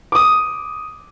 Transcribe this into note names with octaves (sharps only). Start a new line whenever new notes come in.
D6 D#6